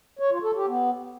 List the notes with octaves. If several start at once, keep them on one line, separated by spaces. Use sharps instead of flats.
C#5
F4
A4
G4
B3